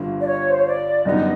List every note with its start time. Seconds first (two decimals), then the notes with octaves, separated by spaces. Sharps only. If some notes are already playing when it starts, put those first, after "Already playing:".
Already playing: G1 G2 D3 F3
0.21 D5
0.27 C#5
0.49 C5
0.58 C#5
0.66 D5
1.05 F#2 D3 G3 B3 D#4 D#5